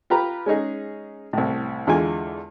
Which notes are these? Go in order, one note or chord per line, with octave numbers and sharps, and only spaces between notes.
F4 G4 B4 A#5
G#3 C#4 D#4 G#4
C2 A2
E2 D3 G#3 F4 G#5